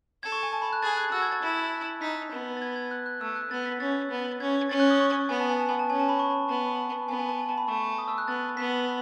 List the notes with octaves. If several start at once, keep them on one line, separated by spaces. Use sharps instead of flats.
A4 G#6
C#6
G#5
A5
B5
F#6
G#4 A6
F#6
F#4 E6
G#6
A6
E4
D#4 B6
B3
A6
G#6
G#6
F#6
F#6
A3 E6
F#6
B3 A6
B6
C#4 A6
B3
C#4 G#6
C#4 A6
F#6
D#6
C#6
B3 G#5
A5
G#5
A5
G#5
A5
C#4 G#5
A5
B5
C#6
B3 A5
B3 G#5
G#5
A5
G#5
A5
B5
A3 C#6
C#6
D#6
E6
F#6
B3 A6
B3 B6